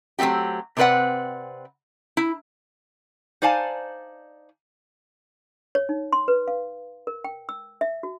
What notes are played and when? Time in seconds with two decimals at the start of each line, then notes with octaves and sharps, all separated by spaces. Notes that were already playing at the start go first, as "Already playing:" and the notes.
0.19 F#3 A3 C4 F#4 G4
0.77 C3 C4 G#4 B4 D5 F#5
2.17 E4
3.42 D#4 C5 D5 F5 G#5 A5
5.75 C#5
5.89 D#4
6.13 C6
6.28 B4
6.48 F5
7.07 A#4
7.24 G5
7.49 E6
7.81 E5
8.03 F#4